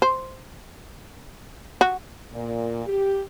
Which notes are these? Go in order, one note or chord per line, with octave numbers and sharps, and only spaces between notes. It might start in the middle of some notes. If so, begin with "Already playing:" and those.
C5
F#4
A#2
G4